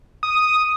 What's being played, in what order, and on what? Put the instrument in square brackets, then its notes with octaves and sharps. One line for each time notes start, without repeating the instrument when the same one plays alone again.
[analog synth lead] D#6